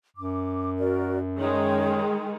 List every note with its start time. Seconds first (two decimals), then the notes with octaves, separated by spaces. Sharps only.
0.17 F#2 D6
0.78 F#4 A#4 D5
1.38 D#3 G#3 G#4 C#5 G5